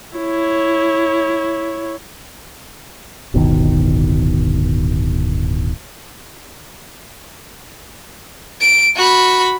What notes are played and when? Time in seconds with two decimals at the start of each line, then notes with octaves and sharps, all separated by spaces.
0.16 E4 C#5
3.34 D1 G1 B2 D#3
8.60 D7
8.96 F#4 B5